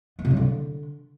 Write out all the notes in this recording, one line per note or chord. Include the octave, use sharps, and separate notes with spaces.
B3
C3
F#3
D3